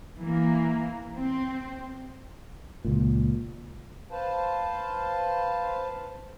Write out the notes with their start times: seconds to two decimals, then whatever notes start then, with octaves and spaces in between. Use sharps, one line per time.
0.20 E3 A#3
1.16 C4
2.85 C#2 A#2
4.11 B4 C5 F5 A5